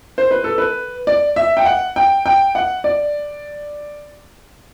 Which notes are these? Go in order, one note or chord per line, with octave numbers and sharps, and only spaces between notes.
C5
B4
A4
B4
D5
E5
G5
F#5
G5
G5
F#5
D5